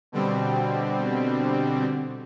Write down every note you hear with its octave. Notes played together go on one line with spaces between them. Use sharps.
B2 D3 G3 C4